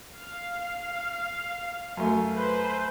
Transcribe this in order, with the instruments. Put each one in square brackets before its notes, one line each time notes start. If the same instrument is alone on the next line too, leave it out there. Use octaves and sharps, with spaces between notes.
[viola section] F5
[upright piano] F#2 A3
[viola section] B4 C5